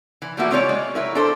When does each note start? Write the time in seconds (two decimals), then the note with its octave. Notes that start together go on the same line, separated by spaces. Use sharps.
0.22 E3
0.37 F3 G3 A3 A#3 E4 F#4
0.51 G#3 C4 C#4 A#4 C#5 D5
0.69 G#3
0.95 F#3 E4 A#4
1.15 D4 A4 C5